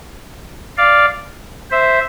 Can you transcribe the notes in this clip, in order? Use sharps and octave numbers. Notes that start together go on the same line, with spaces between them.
D5 F5
C5 E5